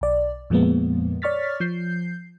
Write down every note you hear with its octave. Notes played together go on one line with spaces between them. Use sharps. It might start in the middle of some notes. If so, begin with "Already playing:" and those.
B1 D5
F2 A#2 F3 G#3 A#3 B3
C#5 D5 C#6 F6 A6 B6
F3 G6 C7